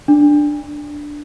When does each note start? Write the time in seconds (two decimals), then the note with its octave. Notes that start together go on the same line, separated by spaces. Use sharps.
0.08 D4